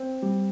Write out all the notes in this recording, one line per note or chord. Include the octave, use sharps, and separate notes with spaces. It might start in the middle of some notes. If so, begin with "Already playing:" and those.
Already playing: C4
G3